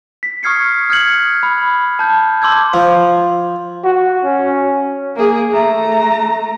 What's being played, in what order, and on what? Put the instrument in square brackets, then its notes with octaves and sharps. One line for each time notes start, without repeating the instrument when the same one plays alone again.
[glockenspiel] B6
C#6 D#6 F6 G#6 C7 C#7
D#6 F6 F#6 G#6 C#7 F#7
B5
A5 G6
A5 C6 D6 E6 G6 G#6
[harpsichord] F3
[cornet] F#4
C#4
[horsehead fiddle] A#3 G#4
A3 A#5